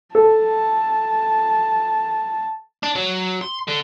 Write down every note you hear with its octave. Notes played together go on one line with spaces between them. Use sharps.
A4 A5
D4
F#3
C6
D3